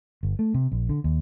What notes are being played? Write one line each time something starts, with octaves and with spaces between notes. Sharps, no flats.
G1
A3
C3
A#1
D3
D#2